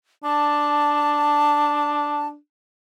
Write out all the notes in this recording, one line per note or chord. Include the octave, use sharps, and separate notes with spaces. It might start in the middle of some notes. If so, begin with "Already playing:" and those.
D4 A5